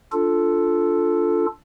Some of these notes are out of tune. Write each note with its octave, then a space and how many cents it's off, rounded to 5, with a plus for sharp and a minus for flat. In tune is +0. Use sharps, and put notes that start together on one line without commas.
D4 -10 F4 +0 A4 +5